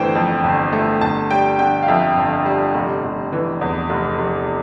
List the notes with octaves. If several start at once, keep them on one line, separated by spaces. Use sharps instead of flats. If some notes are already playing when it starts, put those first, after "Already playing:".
Already playing: G1 E3 A3 C5 G5
F2
G1
A3
G1 A5
G3 G5
D3 G5
F5
F2 E5
G1
G3
F1
F1
E3
E2
F1
F1